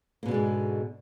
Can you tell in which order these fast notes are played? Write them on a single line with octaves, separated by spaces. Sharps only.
A#3 B2 D3 G#3 G#2